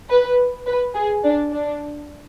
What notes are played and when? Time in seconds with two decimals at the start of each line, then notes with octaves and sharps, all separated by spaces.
0.10 B4
0.66 B4
0.94 G#4
1.23 D4
1.52 D4